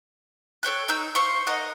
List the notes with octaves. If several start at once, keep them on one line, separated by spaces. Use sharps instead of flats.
A4 C#5 G5 F#6
D#4 E6 G6
C5 F5 C#6
D#4 A#4 D#5 F#5